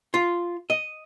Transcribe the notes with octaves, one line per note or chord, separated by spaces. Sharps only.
F4
D#5